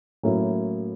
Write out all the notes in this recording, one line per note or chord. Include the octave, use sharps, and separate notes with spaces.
A2 F#3 A#3 C#4 E4